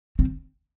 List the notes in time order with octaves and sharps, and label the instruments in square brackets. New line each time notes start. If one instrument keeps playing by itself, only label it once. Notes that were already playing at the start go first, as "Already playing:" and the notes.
[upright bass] C4